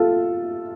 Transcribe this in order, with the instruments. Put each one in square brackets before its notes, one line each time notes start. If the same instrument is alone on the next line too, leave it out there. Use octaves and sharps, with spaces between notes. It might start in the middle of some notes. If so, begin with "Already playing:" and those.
Already playing: [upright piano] F4 A4